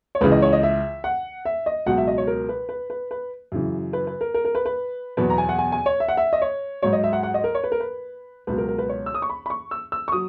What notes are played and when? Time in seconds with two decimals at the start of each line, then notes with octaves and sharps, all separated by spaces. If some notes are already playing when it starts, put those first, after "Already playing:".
0.15 C#5
0.21 C#2 C#3 E3 B4
0.32 D#5
0.42 C#5
0.53 D#5
0.63 E5
1.04 F#5
1.45 E5
1.66 D#5
1.86 C#2 B2 F#3 F#5
1.98 E5
2.07 D#5
2.18 C#5
2.27 A#4
2.49 B4
2.69 B4
2.90 B4
3.11 B4
3.52 F#2 C#3 E3
3.93 B4
4.07 B4
4.21 A#4
4.34 A#4
4.45 A#4
4.55 B4
4.66 B4
5.17 E2 B2 F#3 B4
5.30 A#5
5.38 G#5
5.49 F#5
5.58 G#5
5.72 G#5
5.86 C#5
6.00 E5
6.08 F#5
6.17 E5
6.33 D#5
6.42 C#5
6.83 G#2 F#3 C#5
6.93 D#5
7.04 E5
7.13 F#5
7.23 F#5
7.34 D#5
7.44 A#4
7.55 C#5
7.64 B4
7.72 A#4
7.80 B4
8.47 C#2 B2 F#3 B4
8.58 A#4
8.68 A#4
8.78 B4
8.89 C#5
9.06 E6
9.14 D#6
9.22 C#6
9.29 B5
9.46 B5
9.50 C#6
9.71 E6
9.92 E6
10.08 C#6
10.12 F#3 D#6